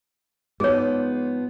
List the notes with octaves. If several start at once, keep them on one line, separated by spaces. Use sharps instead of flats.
G#2 F3 B3 G#4 C#5